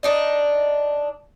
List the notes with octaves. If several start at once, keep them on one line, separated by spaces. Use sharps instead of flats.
D4 D#4 D#5